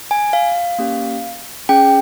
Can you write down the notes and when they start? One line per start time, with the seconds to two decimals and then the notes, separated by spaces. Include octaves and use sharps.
0.11 G#5
0.33 F5
0.79 A#3 C#4 G4
1.69 C#4 G#4 G5